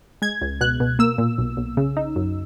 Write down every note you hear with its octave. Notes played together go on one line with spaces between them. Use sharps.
G#3 G#6
C#2
B2 F#6
B2
A#3 E6
A#2
B1
B1
C#3
D#4
F#2